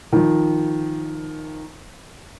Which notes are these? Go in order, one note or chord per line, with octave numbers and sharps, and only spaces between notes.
D#3 F3